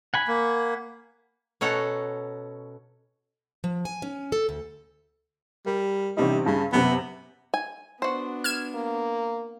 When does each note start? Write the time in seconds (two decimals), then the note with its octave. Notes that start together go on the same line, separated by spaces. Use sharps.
0.14 F#5 G#5 B5
0.28 A#3
1.61 B2 C#4 A4 F#5 A#5
3.64 F3
3.85 G#5
4.02 C#4
4.32 A4
4.49 D2
5.66 G3 A#4
6.17 A1 C3 G3 D#4
6.46 G2 C#3
6.72 F#2 C3 B3
7.54 G#5
8.02 B3 D4 F#4 C5
8.44 F6 G#6 E7
8.75 A#3